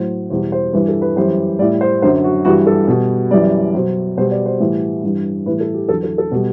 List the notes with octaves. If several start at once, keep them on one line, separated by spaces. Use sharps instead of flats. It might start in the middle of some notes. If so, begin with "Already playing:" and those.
Already playing: A2 F#3 C5
E2 B2 G3 C5
C5
G2 E3 G3 B4
A4
B4
F#2 E3 G3 C5
A2 G3 D5
C5
F#2 D3 F#3 C5
F#4
G2 E3 G3 F#4
A4
B2 G3
F#2 E3 G3 D5
B2 F#3 C5
B2 G3 C5
D5
C5
A2 E3 G3
G2 E3 G3
A2 E3 G3 B4
A4
G4
E2 D3 F#3 A4
A4
A4
B2 G3 G4